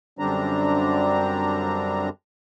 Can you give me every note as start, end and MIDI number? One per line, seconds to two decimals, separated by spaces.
0.19 2.09 42
0.19 2.09 50
0.19 2.09 55
0.19 2.09 60
0.19 2.09 62
0.19 2.09 82